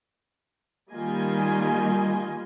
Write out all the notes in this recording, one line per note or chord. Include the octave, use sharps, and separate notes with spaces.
D#3 G3 A#3 F4 D#5 G#5